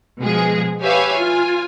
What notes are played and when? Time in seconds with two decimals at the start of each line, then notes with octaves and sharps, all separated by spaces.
0.22 B2 F3 G#3 G#4
0.83 G4 B4 C#5 E5 F5 G#5
1.15 F4 G#5